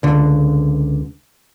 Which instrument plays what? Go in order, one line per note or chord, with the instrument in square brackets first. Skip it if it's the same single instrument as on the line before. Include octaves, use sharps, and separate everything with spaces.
[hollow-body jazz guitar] C#2 D3